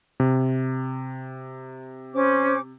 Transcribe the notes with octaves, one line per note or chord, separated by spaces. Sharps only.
C3
C#4 C5 D6